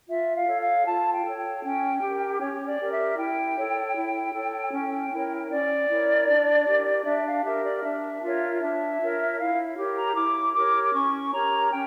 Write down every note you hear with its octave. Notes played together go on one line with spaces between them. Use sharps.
F4 E5
F5
A4 C#5
F5
F4 A5
G5
A4 C#5
G5
C#4 G5
G4 A#4
C#4 C#5
D5
G4 A#4
E5
E4 G5
A4 C#5
E4
A4 C#5
C#4 G5
E4 A#4 C#5
C#4 D5
E4 A#4 C#5
D4
G4 A#4
D4 E5
F5
G4 A#4 E5
D5
D4 E5
F4 A#4 C#5
D4 E5
F4 A#4 C#5
E4 F5
G4 A#4 C#5
A#5
E4 D6
G4 A#4 C#5 D6
D6
C#4 C#6
G4 A#4 C#5 A#5
C#4 G5